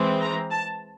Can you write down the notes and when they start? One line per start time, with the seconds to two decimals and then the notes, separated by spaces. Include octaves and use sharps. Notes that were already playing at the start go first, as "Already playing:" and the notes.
Already playing: E3 G#3 C4
0.22 A#5
0.52 A5